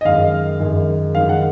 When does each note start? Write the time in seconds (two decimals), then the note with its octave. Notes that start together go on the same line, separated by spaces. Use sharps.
0.01 D#5
0.05 F#2 D#3 G#3 F5
0.60 F#2 D#3 G#3
1.15 F#2 D#3 G#3 F5
1.29 F#5